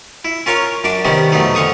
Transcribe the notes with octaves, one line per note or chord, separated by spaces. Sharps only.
E4
C#4 F4 A#4 C#5 F5
F#2 D4 D5 D6
C3 D#3 G3 B3 C#4
F2 B2 F#3 A3 D#4
F2 D3 F5 C#6 D#6